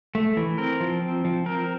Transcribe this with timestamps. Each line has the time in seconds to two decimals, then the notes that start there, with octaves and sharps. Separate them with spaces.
0.15 A3
0.37 E3
0.58 C4 A#4
0.80 F3
1.02 C4
1.25 F3
1.46 C4 A#4